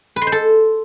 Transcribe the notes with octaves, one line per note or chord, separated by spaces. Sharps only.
B4
C6
C5
A4